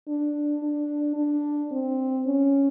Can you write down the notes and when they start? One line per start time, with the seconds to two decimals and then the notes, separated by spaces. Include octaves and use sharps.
0.08 D4
0.63 D4
1.17 D4
1.72 C4
2.26 C#4